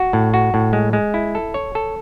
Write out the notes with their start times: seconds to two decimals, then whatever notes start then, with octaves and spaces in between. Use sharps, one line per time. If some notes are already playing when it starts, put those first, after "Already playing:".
Already playing: F#4
0.13 A2
0.34 F#4
0.54 A2
0.73 G#3
0.93 G#3
1.14 E4
1.35 A4
1.54 C#5
1.75 A4